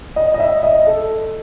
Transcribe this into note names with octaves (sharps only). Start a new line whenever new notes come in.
D#5
D#5
E5
D#5
A4